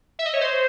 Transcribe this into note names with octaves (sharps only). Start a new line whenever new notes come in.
E5
D#5
C#5
C5